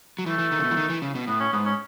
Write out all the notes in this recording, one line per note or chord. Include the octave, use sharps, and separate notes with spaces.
F#3
E3 A3
E3
D#3
C#3
B2
E3
D#3
E3
C#3
B2
A2 B3
C#4
G#2 B3
C#4